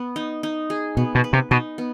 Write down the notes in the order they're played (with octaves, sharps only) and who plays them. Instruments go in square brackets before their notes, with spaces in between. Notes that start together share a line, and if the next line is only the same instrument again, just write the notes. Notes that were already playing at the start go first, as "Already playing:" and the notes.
Already playing: [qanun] B3
D#4
D#4
G#4
[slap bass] B2 [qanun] B3
[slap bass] B2
[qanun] B4
[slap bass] C3
[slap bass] B2 [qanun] D#4
[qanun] B3